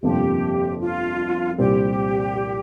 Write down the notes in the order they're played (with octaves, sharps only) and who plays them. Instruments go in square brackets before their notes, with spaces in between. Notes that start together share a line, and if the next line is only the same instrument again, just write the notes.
[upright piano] G1 F2 C3 F3 A#3 [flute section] G4
[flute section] F4
[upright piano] C2 A#2 G3 C4 [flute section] G4